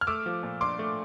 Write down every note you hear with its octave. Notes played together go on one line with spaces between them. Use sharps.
F6
A3 D6 E6
F3
A#2
D4 C6 D6
A3